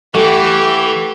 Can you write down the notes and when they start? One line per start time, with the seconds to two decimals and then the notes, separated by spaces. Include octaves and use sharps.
0.14 E3 A3 G4 F#5 C#6